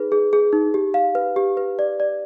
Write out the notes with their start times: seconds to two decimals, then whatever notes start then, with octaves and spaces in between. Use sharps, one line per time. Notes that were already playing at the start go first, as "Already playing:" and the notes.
Already playing: D#4 G#4 B4
0.12 G#4
0.33 G#4
0.53 D#4
0.74 G4
0.94 F5
1.15 B4
1.36 G4
1.57 B4
1.79 D5
2.00 D5